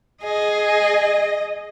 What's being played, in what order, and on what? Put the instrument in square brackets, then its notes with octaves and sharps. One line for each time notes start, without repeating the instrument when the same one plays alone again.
[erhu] G#4 [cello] D#5